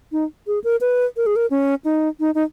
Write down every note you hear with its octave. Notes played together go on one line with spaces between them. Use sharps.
D#4
G#4
A#4
B4
A#4
G#4
A#4
C#4
D#4
D#4
D#4